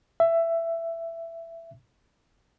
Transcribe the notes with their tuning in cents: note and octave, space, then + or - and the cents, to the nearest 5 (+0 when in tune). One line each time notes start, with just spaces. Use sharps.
E5 +15